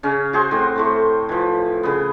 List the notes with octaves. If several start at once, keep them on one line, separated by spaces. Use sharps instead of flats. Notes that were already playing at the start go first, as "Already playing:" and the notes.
C#3 C#4
F#4 G#4 C5
A2 C4
A2 A3 C5
E3 F3
C#3 B3